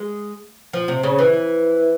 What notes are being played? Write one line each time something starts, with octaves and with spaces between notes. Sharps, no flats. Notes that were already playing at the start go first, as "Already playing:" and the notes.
Already playing: G#3
F3
C3
C#3
E3